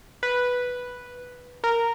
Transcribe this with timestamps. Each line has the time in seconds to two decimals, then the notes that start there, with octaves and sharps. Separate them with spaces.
0.23 B4
1.64 A#4